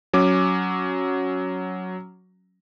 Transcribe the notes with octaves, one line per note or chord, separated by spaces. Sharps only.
F#3 C#4 D6